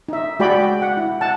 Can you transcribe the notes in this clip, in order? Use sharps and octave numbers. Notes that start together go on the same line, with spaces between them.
D#4 E5
G#3 F#4 G#4 D5 G5 B5
G5
F#5
E4
F#5 A5